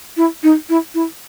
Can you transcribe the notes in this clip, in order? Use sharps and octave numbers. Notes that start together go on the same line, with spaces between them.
E4
D#4
E4
E4